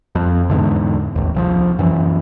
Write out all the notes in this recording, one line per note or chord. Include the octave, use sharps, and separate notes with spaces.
F2
E2 G#2 D3
A1 D#2
C2 E3 F3
F#2 E3